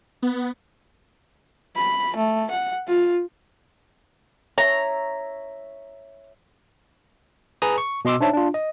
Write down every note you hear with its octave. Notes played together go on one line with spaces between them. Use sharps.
B3
B5
A3
F#5
F4
C#5 E5 A#5
G#4 B4 A#5 D#6
C#6
B2 D#5 C6 D6 E6
D4 D#4 C5 C#5 E5 A5
D4 F4
D#5